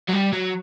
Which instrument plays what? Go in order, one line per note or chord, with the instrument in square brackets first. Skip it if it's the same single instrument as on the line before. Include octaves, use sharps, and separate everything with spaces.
[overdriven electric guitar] F#3
G3
F#3